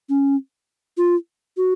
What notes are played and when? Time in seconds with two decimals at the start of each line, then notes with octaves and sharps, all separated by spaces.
0.09 C#4
0.98 F4
1.57 F#4